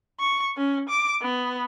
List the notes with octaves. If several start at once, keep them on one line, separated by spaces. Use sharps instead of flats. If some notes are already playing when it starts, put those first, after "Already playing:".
C#6
C#4
D6
B3